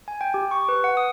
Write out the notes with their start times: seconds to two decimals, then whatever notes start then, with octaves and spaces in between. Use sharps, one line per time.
0.08 G#5
0.21 G5
0.34 G4
0.51 C#6
0.69 B4
0.84 F#5
0.97 D#6